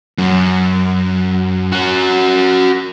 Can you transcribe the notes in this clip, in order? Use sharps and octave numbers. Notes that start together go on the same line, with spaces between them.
F#2
F#4 A#4